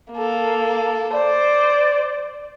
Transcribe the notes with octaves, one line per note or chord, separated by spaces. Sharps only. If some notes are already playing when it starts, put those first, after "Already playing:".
A#3 A4
C5 D5